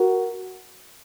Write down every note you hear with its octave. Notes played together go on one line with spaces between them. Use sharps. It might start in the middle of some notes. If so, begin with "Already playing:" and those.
Already playing: F#4 A#4